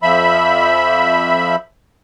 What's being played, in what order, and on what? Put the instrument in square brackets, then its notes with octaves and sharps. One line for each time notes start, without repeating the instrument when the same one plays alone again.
[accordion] F2 F3 E5 B5